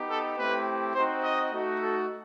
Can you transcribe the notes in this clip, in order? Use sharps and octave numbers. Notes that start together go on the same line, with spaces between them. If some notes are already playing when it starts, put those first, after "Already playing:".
Already playing: B3 D#4 G4
A4
A3 C4 E4 G4 B4
C4 D#4 F#4 C5
D#5
A3 D#4 F#4
A4